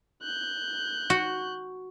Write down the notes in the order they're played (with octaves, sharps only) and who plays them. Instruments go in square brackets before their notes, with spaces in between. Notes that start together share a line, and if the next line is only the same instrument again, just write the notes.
[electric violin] F#6 G6
[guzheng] F#4